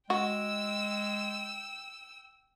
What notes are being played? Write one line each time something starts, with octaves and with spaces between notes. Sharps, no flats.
G#3 F#4 G5 E6